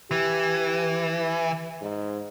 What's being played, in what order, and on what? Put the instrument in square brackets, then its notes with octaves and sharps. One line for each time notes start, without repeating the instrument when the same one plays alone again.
[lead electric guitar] E3 [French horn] G4
[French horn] G#2